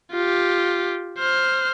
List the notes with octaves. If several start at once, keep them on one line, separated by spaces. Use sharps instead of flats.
F4 G4
C5 F6